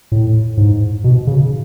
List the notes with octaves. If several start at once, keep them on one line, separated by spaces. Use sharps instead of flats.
A2
G#2
B2
C#3